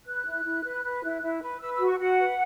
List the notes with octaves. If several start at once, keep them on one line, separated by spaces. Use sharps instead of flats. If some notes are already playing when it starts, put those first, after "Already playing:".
B4 F#6
E4
E4
B4
B4
E4
E4
B4
B4 E6
E6
F#4
C#6
F#4 F#5
B4